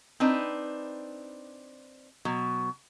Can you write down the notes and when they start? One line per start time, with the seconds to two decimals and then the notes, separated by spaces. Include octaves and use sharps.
0.20 C4 D4 D#4 B4
2.25 B2 F#3